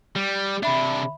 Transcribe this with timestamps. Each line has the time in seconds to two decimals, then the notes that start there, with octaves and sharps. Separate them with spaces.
0.16 G3
0.63 C3 D4 E5 B5